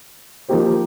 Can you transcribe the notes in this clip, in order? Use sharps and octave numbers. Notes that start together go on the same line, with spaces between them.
F3 A#3 D#4 G4 C5